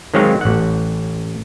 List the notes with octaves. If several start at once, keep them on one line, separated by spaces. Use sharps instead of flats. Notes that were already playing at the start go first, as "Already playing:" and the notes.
D#3 F#3 G#3 C4 C#5 F5
A1 F#5